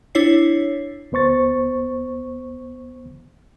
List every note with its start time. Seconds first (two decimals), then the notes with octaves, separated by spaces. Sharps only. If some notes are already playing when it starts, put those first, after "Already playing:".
0.15 D4 E4 C#5 C7
1.12 D2 B3 C5 C#6 A6